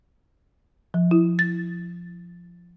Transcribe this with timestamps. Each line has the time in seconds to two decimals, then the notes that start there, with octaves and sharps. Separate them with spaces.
0.94 F3
1.11 E4
1.39 A6